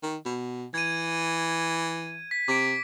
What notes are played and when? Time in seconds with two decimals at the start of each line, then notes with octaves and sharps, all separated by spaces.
0.03 D#3
0.26 B2
0.74 E3 G#6 D#7
2.31 B6
2.48 C3 D6 B6 D7